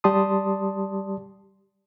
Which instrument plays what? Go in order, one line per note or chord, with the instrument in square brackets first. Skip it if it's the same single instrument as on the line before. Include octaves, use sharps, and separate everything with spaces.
[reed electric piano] G3 G4 D5 A5 C6 D#6